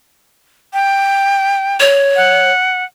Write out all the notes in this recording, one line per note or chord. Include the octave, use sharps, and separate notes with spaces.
G5
C#5
F#5